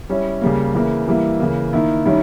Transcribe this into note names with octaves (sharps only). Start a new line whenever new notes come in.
G3 C#4 E4
C#3 G3 A#3
C#3 E3 A#3 E4
E3 G3 A#3 E4
C#3 E3 A#3
D#3 A#3 E4
D#3 G3 C#4 E4